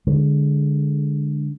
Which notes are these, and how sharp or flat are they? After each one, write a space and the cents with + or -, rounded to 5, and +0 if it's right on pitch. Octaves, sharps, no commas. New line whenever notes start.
D3 +0 G#3 +0